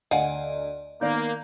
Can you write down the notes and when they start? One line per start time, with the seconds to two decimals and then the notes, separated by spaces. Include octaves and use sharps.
0.11 D2 D5 D#5 F5 F#5 G#5
1.01 D#3 A#3 B3 D5 G6